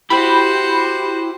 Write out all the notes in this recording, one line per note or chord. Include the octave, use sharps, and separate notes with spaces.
E4 F#4 G4 C5 B5